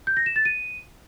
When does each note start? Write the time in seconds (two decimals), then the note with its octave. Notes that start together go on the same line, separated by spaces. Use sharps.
0.07 G6
0.17 A#6
0.26 E7
0.36 A6
0.45 D#7